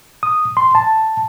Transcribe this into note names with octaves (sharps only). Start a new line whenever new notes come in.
D#6
C6
A5